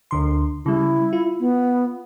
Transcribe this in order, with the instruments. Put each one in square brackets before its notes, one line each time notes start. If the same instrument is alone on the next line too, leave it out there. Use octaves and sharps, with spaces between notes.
[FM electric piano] D2 D3 C6
[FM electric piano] C#3 G3 [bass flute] E4
[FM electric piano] F4
[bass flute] B3